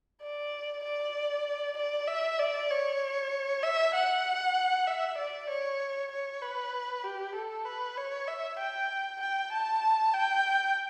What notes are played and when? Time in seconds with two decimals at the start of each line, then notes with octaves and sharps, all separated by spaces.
0.22 D5
0.83 D5
1.77 D5
2.07 E5
2.39 D5
2.70 C#5
3.63 E5
3.94 F#5
4.87 E5
5.18 D5
5.49 C#5
6.11 C#5
6.42 B4
7.04 G4
7.35 A4
7.65 B4
7.97 C#5
8.27 E5
8.59 G5
9.20 G5
9.52 A5
10.13 G5